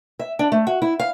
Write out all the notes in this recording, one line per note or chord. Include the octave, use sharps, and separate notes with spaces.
E5
D4
A3
F#4
E4
F5